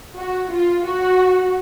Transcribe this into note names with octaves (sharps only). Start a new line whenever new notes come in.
F#4
F4
F#4